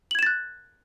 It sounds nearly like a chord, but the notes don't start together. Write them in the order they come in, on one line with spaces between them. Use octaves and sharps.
F#7 G#6 E7 A6 F#6